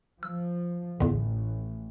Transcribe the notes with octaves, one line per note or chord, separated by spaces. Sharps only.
F3 E6
A1 E2 D3